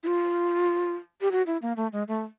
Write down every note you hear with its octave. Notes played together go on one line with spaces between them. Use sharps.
E4
F4
G4
F#4
E4
A#3
A3
G#3
A3